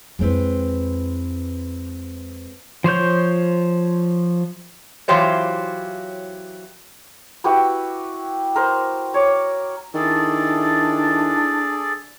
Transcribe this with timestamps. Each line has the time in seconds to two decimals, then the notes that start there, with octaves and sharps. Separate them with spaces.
0.19 F2 G#3 C4 E4 B4
2.84 F3 C5 C#5 G6
5.08 E3 F#3 F4 G4 C5 C#5
7.44 E4 F#4 G4 B4
8.56 A#4 C5
9.14 C#5 D6
9.94 D#3 D4 E4 G#4 A4 D5